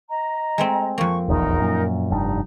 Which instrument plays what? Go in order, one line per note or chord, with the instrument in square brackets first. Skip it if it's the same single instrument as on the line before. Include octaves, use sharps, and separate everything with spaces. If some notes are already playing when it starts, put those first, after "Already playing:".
[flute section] D#5 A#5
[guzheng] G#3 A3 C4
[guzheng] F2 A#3 [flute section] C#6
[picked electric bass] D#1 A#1 E2 [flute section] D#4 A#4
[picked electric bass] F#2 A#2
[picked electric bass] F1 G2 [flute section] D#4